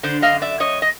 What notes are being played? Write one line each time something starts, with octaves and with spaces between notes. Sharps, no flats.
D3 C5 D5
D#5 F5
F#2
D5 E5
F#2 C#5 D#5
D#5